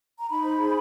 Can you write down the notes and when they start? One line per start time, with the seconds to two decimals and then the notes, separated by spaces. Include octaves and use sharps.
0.19 A#5
0.29 D#4 B5
0.44 C5
0.59 G#4